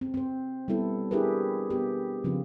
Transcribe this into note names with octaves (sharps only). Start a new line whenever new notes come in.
C4
C4 C5
G3 B3 E4 A4
D4 E4 G4 G#4 A#4 B4
B3 G4
C#3 F3 C4 F4